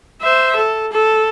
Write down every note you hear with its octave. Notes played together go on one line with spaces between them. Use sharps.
C5 E5
A4
A4